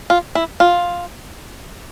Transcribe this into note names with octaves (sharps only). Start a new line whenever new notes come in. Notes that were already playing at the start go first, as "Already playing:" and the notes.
F4
E4
F4